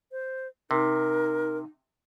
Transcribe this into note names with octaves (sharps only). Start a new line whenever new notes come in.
C5
C3 D#4 A#4